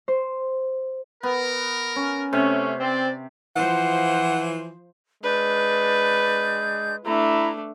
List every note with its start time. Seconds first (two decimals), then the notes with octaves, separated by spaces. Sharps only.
0.08 C5
1.23 B3 A#4
1.96 C#4
2.33 C3 A3 C#4
2.80 C4 D5
3.56 E3 F3 C5 F#5
5.23 G#3 D4 B4 G6
7.05 A3 D4 E4 A#5